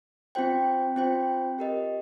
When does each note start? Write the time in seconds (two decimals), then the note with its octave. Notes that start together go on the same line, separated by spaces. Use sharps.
0.35 C4 F4 C5 G5
0.96 C4 F4 C5 G5
1.59 G4 A#4 D#5